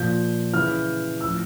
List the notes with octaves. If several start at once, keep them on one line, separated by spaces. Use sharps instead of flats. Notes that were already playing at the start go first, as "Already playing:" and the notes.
Already playing: A#2 F3 G6
C#3 E3 F6
A2 F3 E6